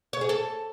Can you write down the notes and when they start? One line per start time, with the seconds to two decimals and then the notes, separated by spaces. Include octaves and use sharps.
0.13 C#5
0.21 G#4
0.29 A4